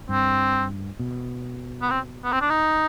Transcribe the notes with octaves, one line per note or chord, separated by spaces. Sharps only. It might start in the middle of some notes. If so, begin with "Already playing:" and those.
G2 C4
B2
B3
C4
B3
C4
D4
D#4